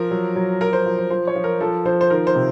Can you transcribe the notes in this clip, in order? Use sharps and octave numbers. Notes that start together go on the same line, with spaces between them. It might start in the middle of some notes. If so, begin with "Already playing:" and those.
Already playing: F3 A#4
F#3
F#3
F3 A#4
C5
F3
C5
F3 C5
C#5
F3
A#4
F3 A4
F3 C5
C5
D#3 A#4
C5
C3